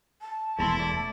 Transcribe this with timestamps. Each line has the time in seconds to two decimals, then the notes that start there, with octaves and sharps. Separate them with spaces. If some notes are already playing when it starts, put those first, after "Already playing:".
0.21 A5
0.59 E1 E2 A3 E4 A#5 C6
0.80 A3 D5